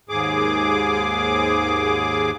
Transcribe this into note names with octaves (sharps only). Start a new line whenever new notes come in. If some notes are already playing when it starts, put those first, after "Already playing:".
D#2 G#2 G#4 D6